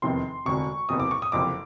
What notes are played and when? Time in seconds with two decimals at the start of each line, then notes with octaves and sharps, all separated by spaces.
0.02 F1 E2 C3 D#3 C6
0.45 E1 D2 C3 C#6
0.89 F#1 E2 C3 D#6
1.00 D6
1.11 C#6
1.22 D#6
1.32 F#1 F2 C3 D6